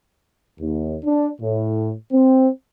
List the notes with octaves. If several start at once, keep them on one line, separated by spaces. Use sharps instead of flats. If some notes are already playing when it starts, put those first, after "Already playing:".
D#2
D4
A2
C4